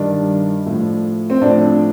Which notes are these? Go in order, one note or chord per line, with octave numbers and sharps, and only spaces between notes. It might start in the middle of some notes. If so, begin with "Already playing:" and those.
Already playing: G2 D#3 D4
A2 F3
C4
A2 F3 D4